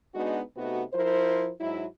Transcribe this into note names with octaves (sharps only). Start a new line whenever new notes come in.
G#3 B3 D4 D#4 F#4
C3 A3 B3 D#4 F#4
F3 E4 A#4 C5
G#2 F#3 D#4 E4